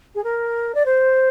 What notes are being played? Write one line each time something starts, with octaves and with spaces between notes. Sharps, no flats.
G#4
A#4
D5
C5